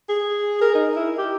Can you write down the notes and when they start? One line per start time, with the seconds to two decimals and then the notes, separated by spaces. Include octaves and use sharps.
0.09 G#4
0.61 A#4
0.75 D#4
0.96 E4
1.18 G4